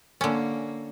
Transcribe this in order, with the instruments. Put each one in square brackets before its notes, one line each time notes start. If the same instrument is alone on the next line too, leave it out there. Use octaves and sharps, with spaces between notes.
[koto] D3 C#4 [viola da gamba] A#3